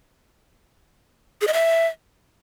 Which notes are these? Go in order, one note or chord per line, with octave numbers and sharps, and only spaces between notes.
G#4
D#5
E5